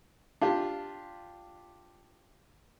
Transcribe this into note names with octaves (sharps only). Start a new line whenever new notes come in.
D4 F4 G4